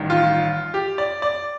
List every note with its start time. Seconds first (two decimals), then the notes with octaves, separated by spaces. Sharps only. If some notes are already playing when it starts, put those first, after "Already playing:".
Already playing: A1 G2 D#3
0.10 F4
0.74 G4
0.98 D5
1.22 D5